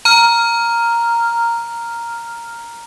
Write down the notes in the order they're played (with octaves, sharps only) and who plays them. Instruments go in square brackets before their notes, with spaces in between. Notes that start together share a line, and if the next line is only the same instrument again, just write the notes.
[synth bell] A#5 F6